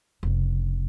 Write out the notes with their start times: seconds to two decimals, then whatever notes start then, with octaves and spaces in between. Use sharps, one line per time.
0.23 F1 C#3